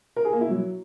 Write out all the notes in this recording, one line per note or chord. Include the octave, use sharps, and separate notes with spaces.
A#4
G#4
A#3
E4
F#3